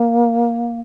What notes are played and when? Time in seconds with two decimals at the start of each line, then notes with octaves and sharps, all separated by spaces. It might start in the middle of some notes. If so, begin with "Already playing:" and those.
Already playing: A#3